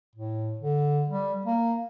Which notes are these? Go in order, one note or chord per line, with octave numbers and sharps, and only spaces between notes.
A2
D3
G3
A#3